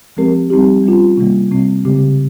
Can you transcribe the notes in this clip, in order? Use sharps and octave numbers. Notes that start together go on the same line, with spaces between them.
F3 G#3 C4 G4 A#4
G3 C4 D#4 G4
G3 C#4 F4
C3 D#3 G3 A#3
C3 G3 C4
C#3 G#3 C4 G4